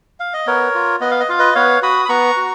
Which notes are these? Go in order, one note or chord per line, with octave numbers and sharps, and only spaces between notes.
F5
D#5
B3 A#4 C#5
F4
B3 D#5
F5
D#5
F4 F5
B4 D#5
B3 C#5 F5
F#4 B5 D#6
B5
B3 A#5 C#6
F#4